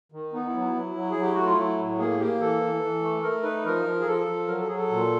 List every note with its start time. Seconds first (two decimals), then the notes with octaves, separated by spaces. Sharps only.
0.12 D#3
0.33 B3 D#4
0.47 E4
0.54 F#3
0.60 E4
0.74 F#3
0.95 F#3
1.11 G#4
1.16 F#3
1.23 G4
1.34 A3 F#4
1.45 F4
1.57 F#3 E4
1.79 A2
1.98 A#3 G#4
2.19 A#3 G4
2.40 E3 A4
2.61 E3
2.82 E3
3.02 A3
3.23 A3 A#4
3.44 D#4 B4
3.65 F3 A#4
3.85 F3
4.00 G#4
4.06 F3 A4
4.27 F3
4.47 F#3 A#4
4.58 A4
4.67 F#3 G#4
4.77 A4
4.89 A#2